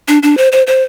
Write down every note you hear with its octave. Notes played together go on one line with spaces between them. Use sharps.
D4
D4
C5
C5
C5